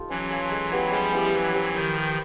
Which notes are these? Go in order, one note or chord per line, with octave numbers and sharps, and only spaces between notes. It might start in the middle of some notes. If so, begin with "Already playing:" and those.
Already playing: D#4 F4 G4 A4
E3 F#3 C#4
F4 A4
G#3
B3 E4 G4
F3 G3 G#3
B3 E4 G4
E3 F#3 E4
G4 C5 F5
D#3 F3 E4
G4 C5 F5